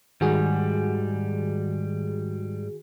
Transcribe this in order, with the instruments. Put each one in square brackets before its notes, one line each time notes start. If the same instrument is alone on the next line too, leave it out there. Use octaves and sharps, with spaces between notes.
[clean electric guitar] G#2 G3 [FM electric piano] D#3 F#4 G#4